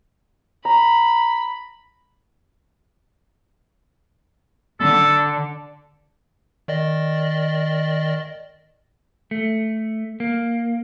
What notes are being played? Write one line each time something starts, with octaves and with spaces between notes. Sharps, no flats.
A#5 B5
D3 A4
D#3 D5 D#5
A3
A#3